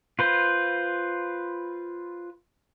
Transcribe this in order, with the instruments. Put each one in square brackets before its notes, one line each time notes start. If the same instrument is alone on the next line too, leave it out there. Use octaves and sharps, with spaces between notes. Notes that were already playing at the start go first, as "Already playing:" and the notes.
[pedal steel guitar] F4 B4 C5